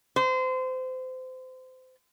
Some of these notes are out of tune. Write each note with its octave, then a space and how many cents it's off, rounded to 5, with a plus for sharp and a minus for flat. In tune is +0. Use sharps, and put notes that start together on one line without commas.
C5 -30